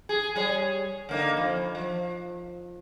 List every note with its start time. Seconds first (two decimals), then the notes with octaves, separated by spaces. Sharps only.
0.09 G#4
0.35 G3 G#4 C#5
1.09 D3 A#3 D#4
1.37 F2
1.75 F3